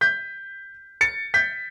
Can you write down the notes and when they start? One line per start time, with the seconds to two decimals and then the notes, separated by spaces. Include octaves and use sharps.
0.01 G6 B6
1.01 A6 C#7
1.34 G6 B6